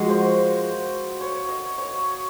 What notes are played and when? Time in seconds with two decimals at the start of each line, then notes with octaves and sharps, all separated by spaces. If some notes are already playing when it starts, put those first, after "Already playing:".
Already playing: F3 G#3 A#3 F#4 G#4
0.09 C5
1.21 C#5
1.49 D#5
1.78 C#5